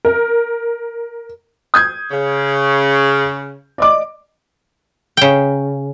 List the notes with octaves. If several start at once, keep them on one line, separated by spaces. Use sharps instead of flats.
A#4
D#6 G6 G#6
C#3
D5 D#5 D6
C#3 G5